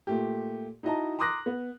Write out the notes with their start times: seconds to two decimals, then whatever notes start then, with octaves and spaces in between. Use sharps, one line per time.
0.07 A#2 A3 G4
0.83 D#4 E4 F#4 D#5 A5 A#5
1.19 A#5 C6 D6 D#6 F#6 A#6
1.46 B3